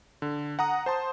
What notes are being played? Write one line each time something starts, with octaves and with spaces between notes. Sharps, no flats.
D3
F#5 A#5 D#6
C5 A5 C6